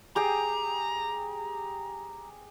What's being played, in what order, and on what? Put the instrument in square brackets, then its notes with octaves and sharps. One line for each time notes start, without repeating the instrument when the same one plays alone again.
[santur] G4 G#4 G5 [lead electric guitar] A#5